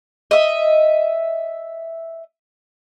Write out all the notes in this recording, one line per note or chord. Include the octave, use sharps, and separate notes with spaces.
D#5 E5